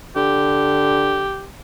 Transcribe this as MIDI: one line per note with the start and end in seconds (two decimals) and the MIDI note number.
0.16 1.31 50
0.16 1.47 67